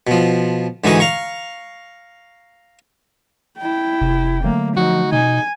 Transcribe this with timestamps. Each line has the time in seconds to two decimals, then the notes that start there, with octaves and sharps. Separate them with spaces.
0.07 B2 F3
0.84 G#2 D3 E3 D#4 F#4 G#5
1.00 F5 A#5 C#6
3.60 E4 G5
4.01 F1 C3
4.44 D3 F#3 A3 A#3
4.77 F3 D#4 F#4
5.12 B2 D#4 G#5